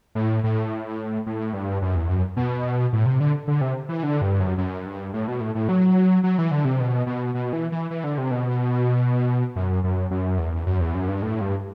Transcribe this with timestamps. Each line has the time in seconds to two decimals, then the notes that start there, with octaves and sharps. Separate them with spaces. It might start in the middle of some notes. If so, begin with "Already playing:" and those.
0.15 A2
0.44 A2
1.26 A2
1.53 G2
1.82 F#2
1.96 E2
2.09 F#2
2.37 B2
2.93 A2
3.06 C3
3.20 D3
3.48 D3
3.61 C3
3.89 E3
4.03 D3
4.21 G2
4.40 F#2
4.58 F#2
4.86 G2
5.14 A2
5.28 B2
5.41 A2
5.55 A2
5.69 F#3
6.24 F#3
6.38 E3
6.51 D3
6.65 C3
6.80 B2
7.06 B2
7.34 B2
7.53 E3
7.72 E3
7.91 E3
8.04 D3
8.18 C3
8.31 B2
9.56 F#2
9.84 F#2
10.11 F#2
10.38 E2
10.66 F#2
10.81 E2
10.95 F#2
11.08 G2
11.22 A2
11.41 G2